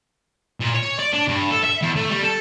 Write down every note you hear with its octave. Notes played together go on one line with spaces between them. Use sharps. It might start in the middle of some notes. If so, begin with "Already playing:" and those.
A#2
C#5
D5
D4
G2
A4
E5
E2
A3
G3
A4